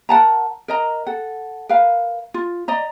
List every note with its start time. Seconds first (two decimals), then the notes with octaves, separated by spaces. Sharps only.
0.09 A#4 F#5 A5 A#5
0.68 A#4 D#5 A#5
1.07 A4 F#5
1.69 A#4 B4 F5
2.34 F4
2.68 D5 D#5 A#5